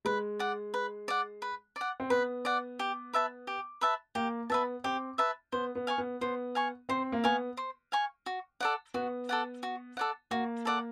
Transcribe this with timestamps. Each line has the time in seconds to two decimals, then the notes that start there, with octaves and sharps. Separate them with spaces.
0.05 G#3 B4
0.39 D5 F#5
0.74 B4
1.08 D5 F#5
1.42 B4
1.76 D5 F#5
2.00 C4
2.10 B3 B4
2.45 D5 F#5
2.79 G4
3.13 B4 E5 A5
3.47 G4
3.81 B4 E5 A5
4.15 A#3 G4
4.50 B3 B4 E5 A5
4.84 C4 G4
5.18 B4 E5 A5
5.52 B3 C5
5.75 B3
5.87 F5 G#5 C#6
5.98 B3
6.21 B3 C5
6.55 F5 G#5 C#6
6.89 C4 C5
7.12 A#3
7.24 B3 F5 G#5 C#6
7.57 C5
7.92 F5 G#5 C#6
8.26 F#4
8.60 A4 D5 F#5
8.94 B3 F#4
9.29 A4 D5 F#5
9.63 F#4
9.97 A4 D5 F#5
10.31 A#3 F#4
10.65 A4 D5 F#5